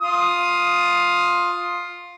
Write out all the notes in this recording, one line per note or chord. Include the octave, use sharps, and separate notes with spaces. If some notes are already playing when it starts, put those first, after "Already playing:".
F4 D#6